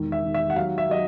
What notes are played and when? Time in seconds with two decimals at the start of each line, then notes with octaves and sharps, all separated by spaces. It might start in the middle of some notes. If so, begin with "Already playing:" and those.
Already playing: E1 D#3
0.12 E5
0.24 D#3
0.34 E5
0.50 F#5
0.56 F#3 F5
0.78 E5
0.90 F#3 D#5